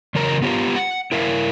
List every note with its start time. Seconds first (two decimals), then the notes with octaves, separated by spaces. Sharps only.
0.15 E2 C#3 F#3 A#4 A#5
0.42 B3 F4 G4 A4 F5 A#5
0.76 F#5
1.12 E4 A#4 E5 F5